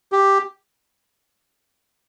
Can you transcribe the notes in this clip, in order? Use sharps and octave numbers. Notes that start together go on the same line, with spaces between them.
G4